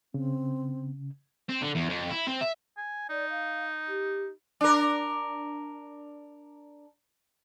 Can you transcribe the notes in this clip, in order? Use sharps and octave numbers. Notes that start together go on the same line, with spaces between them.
C#3 C4
C4
D3
E2
F2
E4
C4
E5
G#5
D#4 D5
F5
G4
D4 A#4